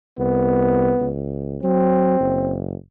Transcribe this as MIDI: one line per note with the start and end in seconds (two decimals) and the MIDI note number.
0.19 0.93 36
0.19 1.08 59
1.00 1.58 37
1.63 2.16 54
1.63 2.55 60
2.20 2.75 30